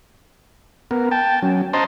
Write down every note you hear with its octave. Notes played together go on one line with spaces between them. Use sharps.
B3 A#4
G5 A5
F#3 C#4
C5 D#5 A5 A#5 C6